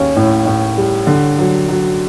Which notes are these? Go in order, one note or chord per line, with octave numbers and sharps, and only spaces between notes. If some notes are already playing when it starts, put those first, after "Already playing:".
Already playing: D#2 C#4
A2
A2
G3
D3
F#3
F#3